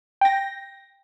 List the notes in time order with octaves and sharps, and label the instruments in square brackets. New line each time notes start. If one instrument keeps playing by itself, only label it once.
[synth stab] G5 A#6